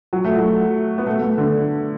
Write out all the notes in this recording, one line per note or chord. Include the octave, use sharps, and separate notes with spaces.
F#3
A3
F#3
B3
A3
A3
D3